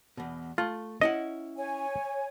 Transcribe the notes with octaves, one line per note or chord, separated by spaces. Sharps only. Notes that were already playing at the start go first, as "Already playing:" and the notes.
E2 B2
A3 F4
C#4 E4 D#5 F#5
C#5 G#5